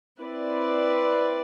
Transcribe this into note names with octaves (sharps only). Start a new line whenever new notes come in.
C4 E4 B4 D5